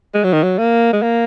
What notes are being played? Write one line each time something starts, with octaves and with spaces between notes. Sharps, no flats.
G#3
F#3
D#3
F#3
A#3
G#3
A#3